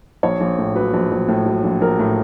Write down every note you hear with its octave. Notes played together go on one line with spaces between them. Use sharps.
A#1 C#5
A#1
A2
F#3 B4
A#1
A#1
A2
F#3
A#1
A#1 A#4
A2